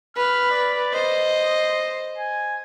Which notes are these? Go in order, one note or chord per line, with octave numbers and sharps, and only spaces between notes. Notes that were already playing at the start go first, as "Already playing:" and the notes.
B4 F6
D5
C5 D#5
G#5